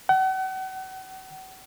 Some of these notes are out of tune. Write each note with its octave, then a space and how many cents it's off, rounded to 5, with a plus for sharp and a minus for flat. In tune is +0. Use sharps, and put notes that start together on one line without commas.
F#5 +40